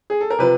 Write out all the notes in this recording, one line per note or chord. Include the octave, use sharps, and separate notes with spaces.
G#4
A4
A#4
C3 F3 B4